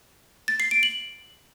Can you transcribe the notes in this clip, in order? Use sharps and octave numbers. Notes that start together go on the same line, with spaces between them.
A6
C7
D7
F#7